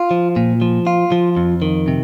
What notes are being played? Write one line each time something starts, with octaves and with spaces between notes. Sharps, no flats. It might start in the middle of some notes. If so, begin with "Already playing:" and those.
Already playing: F4
F3
A#2
F3
F4
F3
F2
D#3
C3